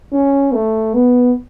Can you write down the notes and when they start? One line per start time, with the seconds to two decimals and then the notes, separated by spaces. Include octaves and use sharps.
0.12 C#4
0.53 A3
0.94 B3